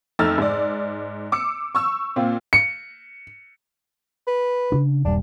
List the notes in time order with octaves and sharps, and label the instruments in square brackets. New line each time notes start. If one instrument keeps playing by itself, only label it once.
[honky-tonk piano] F2 A3 D#4 E6 F6 A6
G#2 D5
D6 E6 C#7
C#6 E6
A#2 C4 F4
[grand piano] C#7
[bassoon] B4
[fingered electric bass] C#3 D4
[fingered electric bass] D#1 G2 G3 [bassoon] D4